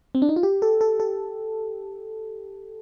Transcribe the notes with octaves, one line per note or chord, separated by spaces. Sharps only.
C4
D4
D#4
F4
G4
A4
A4
A4